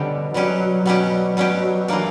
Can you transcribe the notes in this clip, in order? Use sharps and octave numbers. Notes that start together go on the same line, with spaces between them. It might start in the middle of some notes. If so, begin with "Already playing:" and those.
Already playing: B2 D3 G3 C#4 G4
B2 F#3 G3 C#4 G4
B2 F#3 G3 C#4 G4
B2 F#3 G3 C#4 G4
E3 A#3 D4